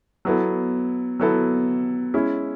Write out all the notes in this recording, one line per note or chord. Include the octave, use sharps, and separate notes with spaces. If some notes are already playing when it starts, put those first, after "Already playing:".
F#3 B3 E4 A4
F#3 B3 E4 A4
G#3 C#4 E4